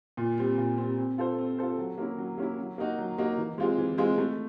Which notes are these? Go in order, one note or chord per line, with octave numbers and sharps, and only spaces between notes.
A#2
G3 C4
A#2
G3 C4
C4
F4 A4 C5
C4
F4 A4 C5
F#3
A#3 C#4 E4
F#3
A#3 C#4 E4
F#3
A#3 D#4 F#4
F#3
A#3 D#4 F#4
E3
G#3 C4 F4 G#4
E3
G#3 C4 F4 G#4
A3